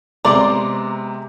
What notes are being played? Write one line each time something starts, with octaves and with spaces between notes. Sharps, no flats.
C3 G#3 B3 D5 A#5 C6 D6